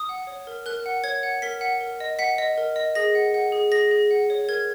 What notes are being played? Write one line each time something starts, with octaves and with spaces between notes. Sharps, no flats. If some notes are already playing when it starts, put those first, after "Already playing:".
Already playing: D#6
F#5
C#5
A#4
A#4 F#6
F#5
C#5 G#6
F#5
A#4 B6
F#5
A#4
D#5
F#5 B6
D#5
A#4
D#5
G#4 A#6
F#5
F#5
G#4
G#4 A#6
G#4
F#5
C#5
A#4 G#6